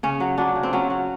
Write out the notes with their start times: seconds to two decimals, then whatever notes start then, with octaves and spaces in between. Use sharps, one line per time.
0.03 C#3 C#4
0.20 F#3
0.38 F#3 D4
0.56 C#3
0.63 C4
0.73 F#3 C#4
0.90 F#3